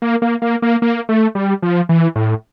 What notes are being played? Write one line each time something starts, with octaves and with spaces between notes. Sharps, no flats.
A#3
A#3
A#3
A#3
A#3
A3
G3
F3
E3
A2